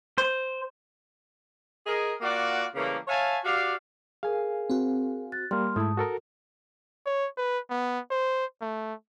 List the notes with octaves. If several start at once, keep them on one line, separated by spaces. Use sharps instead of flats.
C5
G#4 A#4 D#5
A#3 F4 F#4 D5 F#5
C#3 E3 G3 A3 A#3
C#5 E5 F5 G#5 A5
F#4 G4 D5 F5
G#4 A#4 F5 G#5
C4 F#4
F#6 A6
G3 A#3 C6 F6
G#2 A3 E4 A5 D#6
F#4 A4 A#4
C#5
B4
B3
C5
A3